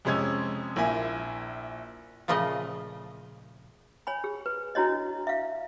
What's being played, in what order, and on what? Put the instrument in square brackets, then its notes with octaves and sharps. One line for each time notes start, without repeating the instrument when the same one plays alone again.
[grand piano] F2 C3 G#3 C#4 G#6
A#1 A#3 E4 E5 G#5
[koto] A#2 C#3 F3 A3 D#5
[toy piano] C#5 G#5 B5
G#4
B4
D4 E4 F#4 C#5 D#5
E5 F5